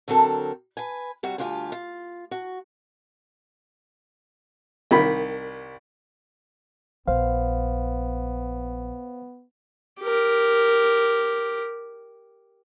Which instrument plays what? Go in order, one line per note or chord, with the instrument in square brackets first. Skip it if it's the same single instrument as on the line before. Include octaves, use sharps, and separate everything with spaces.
[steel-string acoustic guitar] D3 F#3 C4 A4 A#4
B4 G#5
C3 G3 F#4 C5
D2 G2 F4 G4 G5 G#5
F4
F#4
[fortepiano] C2 D#3 B5
[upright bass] A#1 [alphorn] B3 [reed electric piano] C5 F5
[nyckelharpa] G4 A#4